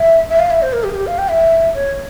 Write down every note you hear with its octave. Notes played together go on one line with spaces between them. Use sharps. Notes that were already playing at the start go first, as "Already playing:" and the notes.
Already playing: E5
E5
F5
E5
C5
A#4
G4
G#4
G4
F5
G5
E5
C#5